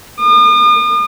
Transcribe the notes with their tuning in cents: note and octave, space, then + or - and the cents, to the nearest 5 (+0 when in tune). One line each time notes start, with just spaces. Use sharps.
D#6 -45